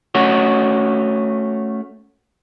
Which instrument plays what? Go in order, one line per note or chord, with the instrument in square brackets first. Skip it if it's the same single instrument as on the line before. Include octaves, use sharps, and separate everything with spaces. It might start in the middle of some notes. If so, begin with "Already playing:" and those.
[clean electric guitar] A3 C#4 F#4